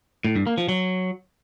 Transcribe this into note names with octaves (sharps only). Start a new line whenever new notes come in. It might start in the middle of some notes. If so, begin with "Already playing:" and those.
A2
G2
A#3
F3
F#3